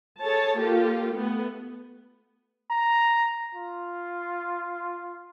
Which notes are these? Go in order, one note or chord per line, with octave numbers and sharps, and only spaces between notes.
G#4 A4 C#5 A5
A#3 F4 G4 A4
A3 B3
A#5
F4